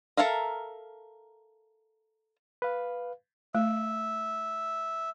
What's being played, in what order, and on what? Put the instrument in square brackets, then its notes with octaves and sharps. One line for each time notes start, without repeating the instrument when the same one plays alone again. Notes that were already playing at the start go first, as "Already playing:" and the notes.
[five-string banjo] A4 A#4 E5 F5 A#5
[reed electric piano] B4 F5
[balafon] A3 [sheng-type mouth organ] E5